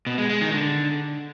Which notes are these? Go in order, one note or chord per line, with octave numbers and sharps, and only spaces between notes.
B2
G#3
G#3
D#3
D3